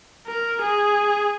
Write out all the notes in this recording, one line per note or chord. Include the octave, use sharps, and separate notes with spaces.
A#4
G#4